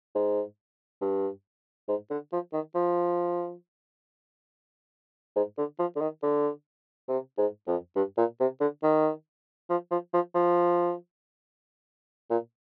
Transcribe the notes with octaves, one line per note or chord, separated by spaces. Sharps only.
G#2
G2
G#2
D3
F3
D#3
F3
G#2
D3
F3
D3
D#3
D3
C3
G#2
F2
G2
A#2
C3
D3
D#3
F3
F3
F3
F3
A#2